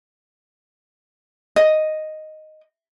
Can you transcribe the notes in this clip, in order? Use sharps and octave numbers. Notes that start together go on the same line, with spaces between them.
D#5